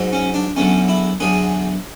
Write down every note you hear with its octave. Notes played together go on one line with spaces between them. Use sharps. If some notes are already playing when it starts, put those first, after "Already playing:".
Already playing: G#2 F#3
C#4
D4
E2 D3 F#3 C#4
E4
E2 D3 F#3 G#4